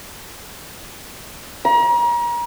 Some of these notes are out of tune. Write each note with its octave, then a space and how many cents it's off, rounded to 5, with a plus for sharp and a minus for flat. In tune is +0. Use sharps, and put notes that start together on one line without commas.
A#5 +35